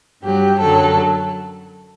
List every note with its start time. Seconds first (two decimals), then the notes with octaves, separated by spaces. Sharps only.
0.23 G2 F#3 G4
0.61 F#2 D3 F#3 A4